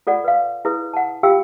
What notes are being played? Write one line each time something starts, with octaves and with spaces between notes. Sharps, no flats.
F4 A4 D5 F#5
B4 F5
E4 G#4 B4 D#6
F#5 A5
F4 G4 F5 G5 E6